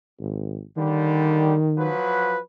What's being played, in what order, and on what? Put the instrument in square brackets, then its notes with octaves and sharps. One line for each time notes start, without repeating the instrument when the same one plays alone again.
[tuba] G#1
[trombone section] D#2 D3 G3 [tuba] D#3
[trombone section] F3 F#3 B4